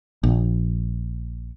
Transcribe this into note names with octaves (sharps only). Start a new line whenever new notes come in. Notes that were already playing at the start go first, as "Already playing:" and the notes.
A#1